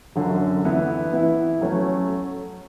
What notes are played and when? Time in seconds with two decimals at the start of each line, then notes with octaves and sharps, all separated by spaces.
0.16 F#2 D3 F#3
0.65 E3 B3 E4
1.12 E3 B3 E4
1.61 F#3 A3 C#4